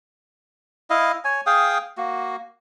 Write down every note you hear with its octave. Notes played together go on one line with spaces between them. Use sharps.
E4 D#5 F5
C#5 G#5
G#4 F5 G5 D#6
A#3 F#4